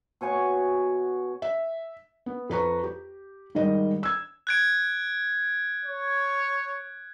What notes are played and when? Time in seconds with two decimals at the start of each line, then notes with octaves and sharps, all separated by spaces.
0.21 B2 C#5 G#5 C#6
1.42 E5
2.26 B3
2.50 F2 B4 A#5 C#6
2.84 G4
3.55 G#2 D#3 G3 D#5
4.03 E6 G#6
4.47 F#6 G#6 D7
5.85 C#5